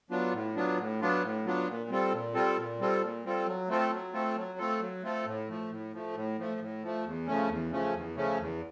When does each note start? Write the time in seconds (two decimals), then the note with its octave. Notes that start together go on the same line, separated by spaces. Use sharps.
0.11 F#3 B3 D4 F4
0.33 A2
0.56 F#3 B3 D4 F4
0.78 A2
1.01 F#3 B3 D4 F4
1.23 A2
1.45 F#3 B3 D4 F4
1.68 A#2
1.89 G3 C4 F4 A4
2.13 A#2
2.34 G3 C4 F4 A4
2.58 A#2
2.79 G3 C4 F4 A4
3.02 A#2
3.24 G3 C4 F4 A4
3.47 F#3
3.69 A3 C4 F4 A4
3.92 F#3
4.13 A3 C4 F4 A4
4.37 F#3
4.58 A3 C4 F4 A4
4.80 F#3
5.03 A3 C4 F4 A4
5.26 A2
5.48 F3 A3
5.70 A2
5.93 F3 A3
6.14 A2
6.38 F3 A3
6.60 A2
6.83 F3 A3
7.05 E2
7.27 C#3 F3 A3 C#4
7.49 E2
7.71 C#3 F3 A3 C#4
7.93 E2
8.16 C#3 F3 A3 C#4
8.39 E2